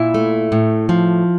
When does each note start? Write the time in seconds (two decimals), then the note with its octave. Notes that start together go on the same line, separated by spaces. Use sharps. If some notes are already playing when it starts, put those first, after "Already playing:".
Already playing: A#2 E4
0.14 A3
0.52 A2
0.89 F3